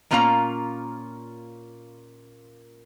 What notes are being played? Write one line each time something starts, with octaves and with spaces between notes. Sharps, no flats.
A#2 A#3 C#4 F4 F5 A#5